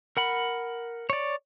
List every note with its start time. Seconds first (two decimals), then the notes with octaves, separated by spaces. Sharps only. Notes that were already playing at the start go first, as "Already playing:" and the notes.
0.17 A#4 F#5 B5
1.10 C#5 D5